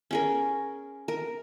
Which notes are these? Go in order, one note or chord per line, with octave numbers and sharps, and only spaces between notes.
C#4 G#4 A#4
A#4